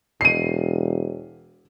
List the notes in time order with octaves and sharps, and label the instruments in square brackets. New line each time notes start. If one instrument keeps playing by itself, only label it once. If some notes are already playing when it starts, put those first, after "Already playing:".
[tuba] E1 [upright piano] C7 D#7